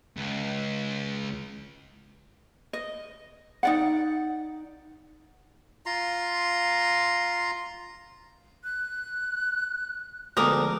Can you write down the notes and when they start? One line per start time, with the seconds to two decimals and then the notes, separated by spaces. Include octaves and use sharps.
0.17 C#2
2.73 D#5
3.63 D#4 D5 F#5
5.86 F4 A#5 C6
8.64 F#6
10.37 D2 F3 G#3 B3 A#4 D6 D#6